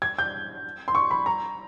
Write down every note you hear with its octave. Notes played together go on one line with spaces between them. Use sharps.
G#6
G6
C6
C#6
B5
A#5